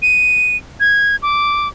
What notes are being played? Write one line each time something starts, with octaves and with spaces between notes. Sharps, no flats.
D#7
G#6
D6